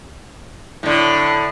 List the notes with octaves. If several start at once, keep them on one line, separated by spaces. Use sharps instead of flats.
A2 D3